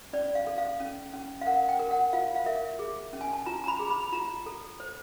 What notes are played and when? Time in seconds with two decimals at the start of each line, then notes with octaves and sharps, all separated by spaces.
0.13 C#4 D5
0.35 F5
0.47 A4
0.58 F5
0.80 C#4
1.13 C#4
1.41 F5
1.46 A#4 F#5
1.69 G5
1.79 A#4
1.91 F#5
2.13 F4 F5
2.36 F5
2.46 A#4 E5
2.79 G#4
3.13 C#4
3.21 G#5
3.33 A5
3.46 F4 A#5
3.64 A#5
3.68 B5
3.79 G#4
3.91 B5
4.13 F4 A#5
4.46 A4
4.80 C5